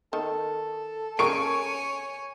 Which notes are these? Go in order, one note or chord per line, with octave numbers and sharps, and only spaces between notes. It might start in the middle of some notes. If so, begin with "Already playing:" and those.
D#3 A4
C#3 A3 A#4 C#5 G#5 C#6 D7